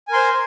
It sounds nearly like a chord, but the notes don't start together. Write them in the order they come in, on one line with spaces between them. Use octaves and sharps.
G#5 A#4 C6 C5